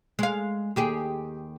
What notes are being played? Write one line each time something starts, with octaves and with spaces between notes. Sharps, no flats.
G#3 F5
D#2 G4 G#4